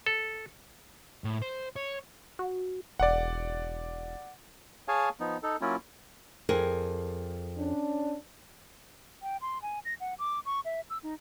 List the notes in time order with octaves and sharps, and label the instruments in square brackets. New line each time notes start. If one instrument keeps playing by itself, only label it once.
[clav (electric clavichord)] A4
[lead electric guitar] A2
C5
C#5
[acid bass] F#4
[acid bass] E1 [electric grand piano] D5 F#5
[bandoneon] G#4 C#5 F5 G#5 A5
F3 B3 D#4
D#4 A4
F#3 A#3 C#4 E4 F4
[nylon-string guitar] F2 G#4 A#4
[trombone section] C#4 D4
[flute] G5
C6
G#5
A#6
F#5
D6
C#6
E5
E6
D#4